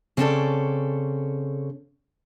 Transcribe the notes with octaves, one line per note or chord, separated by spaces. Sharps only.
C#3 C4 C#4 F#4 A4 D5